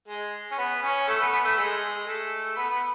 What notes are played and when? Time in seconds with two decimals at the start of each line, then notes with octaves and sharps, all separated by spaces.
0.08 G#3
0.51 C#4
0.58 B3
0.82 C#4
1.07 A3
1.20 B3
1.32 B3
1.44 A3
1.57 G#3
2.07 A3
2.56 B3
2.69 B3